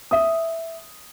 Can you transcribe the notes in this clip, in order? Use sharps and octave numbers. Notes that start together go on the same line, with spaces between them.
E5 D#6